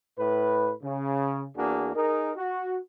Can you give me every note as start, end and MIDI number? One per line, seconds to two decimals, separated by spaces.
0.17 0.71 45
0.17 0.71 71
0.82 1.46 49
1.55 1.90 40
1.55 1.90 58
1.55 1.90 62
1.55 1.90 66
1.55 1.90 68
1.94 2.31 63
1.94 2.31 68
1.94 2.31 70
2.36 2.78 66